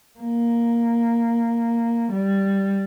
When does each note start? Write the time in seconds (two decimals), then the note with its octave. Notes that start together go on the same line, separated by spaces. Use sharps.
0.19 A#3
2.12 G3